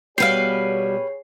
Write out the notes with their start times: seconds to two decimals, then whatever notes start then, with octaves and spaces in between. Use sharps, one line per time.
0.18 B2 G3 G4 G#4 B4 C#5 F5 C7